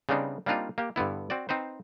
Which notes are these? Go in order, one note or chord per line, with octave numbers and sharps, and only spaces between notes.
C#3 G3 B3 C4 D4 D#4
G3 A#3 C4 D4 D#4 F4
A#3 G4
G2 D3 B3 E4
C4 F#4 D5
C4 D#4 B4 C5